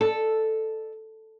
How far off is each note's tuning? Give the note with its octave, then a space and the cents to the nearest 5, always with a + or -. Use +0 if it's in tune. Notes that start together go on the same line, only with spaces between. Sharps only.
A4 +0 D5 +45